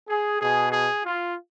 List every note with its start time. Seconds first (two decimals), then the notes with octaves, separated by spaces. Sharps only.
0.08 G#4
0.40 B2 G#4
0.72 G#4
1.05 F4